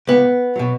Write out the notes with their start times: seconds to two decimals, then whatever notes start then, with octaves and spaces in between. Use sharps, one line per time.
0.07 C#2 B3
0.56 B2 F#3